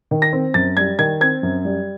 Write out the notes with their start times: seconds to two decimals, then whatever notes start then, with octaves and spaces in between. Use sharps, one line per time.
0.11 D#3
0.22 A#6
0.33 C4
0.54 F#2 A6
0.77 G3 G#6
0.99 D#3 G#6
1.21 C4 G#6
1.43 F#2
1.65 G3